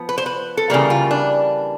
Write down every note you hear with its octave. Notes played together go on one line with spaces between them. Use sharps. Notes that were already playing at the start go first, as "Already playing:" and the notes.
Already playing: F3 B3
B4
C5
B4
A4
C#3 E3 G3 A#3 A#4
F4
D4